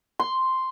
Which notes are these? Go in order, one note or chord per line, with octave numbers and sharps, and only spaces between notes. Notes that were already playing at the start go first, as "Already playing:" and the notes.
C6